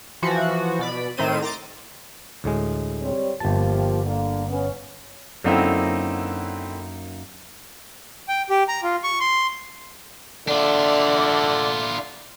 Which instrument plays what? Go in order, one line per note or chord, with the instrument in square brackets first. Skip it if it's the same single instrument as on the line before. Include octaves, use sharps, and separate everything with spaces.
[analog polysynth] E3 F3 F#4
B2 D5 B5
A2 D#3 C4 C5 D#7
A#5 C6 D6 A6
[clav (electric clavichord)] D2 A2 G#3
[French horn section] G3 C4 C#5
[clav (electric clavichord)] G1 A5 [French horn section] F3 A#3 G4
[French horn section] D3 A#3
B3 C#4
[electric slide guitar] F#2 A#3 D#4 [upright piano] D3 C4 E4
[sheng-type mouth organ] G5
G4
A#5
F4
C#6
C6
[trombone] D3 [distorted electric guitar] D4 F4 [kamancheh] D5 E5